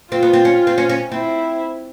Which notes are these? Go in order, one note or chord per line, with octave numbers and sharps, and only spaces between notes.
C4 F4
B3
C4
C#4
C4
C#4
C#4
C4 E4